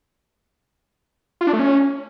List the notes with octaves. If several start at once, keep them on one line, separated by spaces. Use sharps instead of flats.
F4
D4
A3
C#4